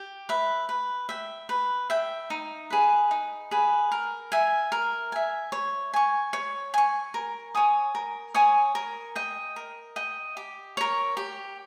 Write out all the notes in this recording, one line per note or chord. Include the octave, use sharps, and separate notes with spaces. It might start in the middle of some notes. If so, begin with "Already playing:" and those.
Already playing: G4
B4 E5
B4
E5 G5
B4
E5 G5
D#4
G#4 B4
D#4
G#4 B4
A#4
E5 G#5
A#4
E5 G#5
C#5
G#5 C#6
C#5
G#5 C#6
A#4
C#5 G#5 D#6
A#4
C#5 G#5 D#6
A#4
D#5 G5
A#4
D#5 G5
G4
A#4 C#5
G4